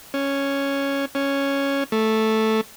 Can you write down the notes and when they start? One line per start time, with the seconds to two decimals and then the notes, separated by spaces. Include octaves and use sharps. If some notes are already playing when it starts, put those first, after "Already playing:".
0.14 C#4
1.15 C#4
1.92 A3